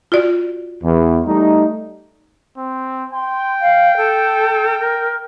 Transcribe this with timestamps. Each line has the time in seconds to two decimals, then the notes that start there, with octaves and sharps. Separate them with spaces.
0.12 F4 F#4 D5
0.83 E2
1.26 G3 A3 D#4
2.58 C4
3.13 G5 C6
3.61 F5
3.97 A4
4.79 A#4